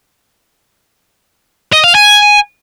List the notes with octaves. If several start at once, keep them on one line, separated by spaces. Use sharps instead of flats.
D#5
F5
G#5